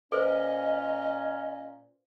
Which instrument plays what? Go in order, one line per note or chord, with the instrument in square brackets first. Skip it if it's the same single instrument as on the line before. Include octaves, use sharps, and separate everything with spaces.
[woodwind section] A#2 C#4 [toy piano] A4 B4 C5 [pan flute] D#5